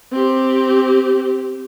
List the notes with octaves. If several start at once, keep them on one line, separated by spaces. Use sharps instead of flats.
C4 G4